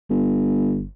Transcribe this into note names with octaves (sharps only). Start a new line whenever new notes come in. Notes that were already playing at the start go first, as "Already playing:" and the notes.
G1